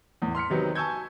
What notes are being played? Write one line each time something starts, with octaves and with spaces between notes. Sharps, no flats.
E2 A2
C6 F6 B6 C#7
C3 D#3 F#3 B3
G#5 A5 C#6 E6 G6 G#6